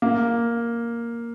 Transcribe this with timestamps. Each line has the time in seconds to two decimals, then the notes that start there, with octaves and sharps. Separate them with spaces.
0.02 A#3